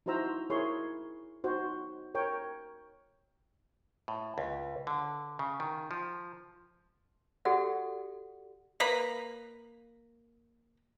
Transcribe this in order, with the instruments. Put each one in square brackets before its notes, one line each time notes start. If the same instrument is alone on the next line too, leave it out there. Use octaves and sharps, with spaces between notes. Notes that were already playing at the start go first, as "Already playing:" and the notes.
[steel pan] D#4 E4 F#4 C5 A#5 E6
E4 G#4 A#4 C#5 C6
D#4 F#4 C5
A#4 C#5 G5
[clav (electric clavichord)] A2
C#2
D3
C#3
D#3
F3
[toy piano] F#4 G4 A4 D5 F#5
[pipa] A#3 B4 A#5 B5